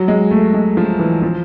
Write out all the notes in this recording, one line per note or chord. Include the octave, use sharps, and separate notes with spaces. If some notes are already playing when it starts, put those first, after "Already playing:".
Already playing: F#3
G#3
A3
G#3
F3
E3
F3